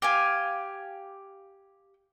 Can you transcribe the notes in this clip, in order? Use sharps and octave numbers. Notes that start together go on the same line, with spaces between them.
G4 F5 G#5